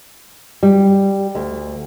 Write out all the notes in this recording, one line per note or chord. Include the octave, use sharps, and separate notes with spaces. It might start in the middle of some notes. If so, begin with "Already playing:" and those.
G3
D2